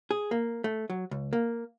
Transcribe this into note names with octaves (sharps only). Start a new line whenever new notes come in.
G#4
A#3
A3
F#3
C#2
A#3